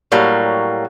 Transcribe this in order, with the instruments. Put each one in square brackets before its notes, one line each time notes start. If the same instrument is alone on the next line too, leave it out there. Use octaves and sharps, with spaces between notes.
[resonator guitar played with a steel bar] A2 F#3 G3 A#3